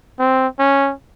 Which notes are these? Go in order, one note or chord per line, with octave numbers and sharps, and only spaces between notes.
C4
C#4